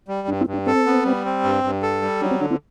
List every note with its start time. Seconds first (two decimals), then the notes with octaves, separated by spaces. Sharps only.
0.08 G3
0.28 G2 D4
0.41 C4 E4
0.47 G2
0.53 D4
0.66 C4 A4
0.86 B3
1.05 G3
1.25 C4
1.44 G2
1.64 G2
1.83 A4
2.02 G3
2.21 F#3 D4
2.31 C4
2.40 D3 D4
2.50 C4 E4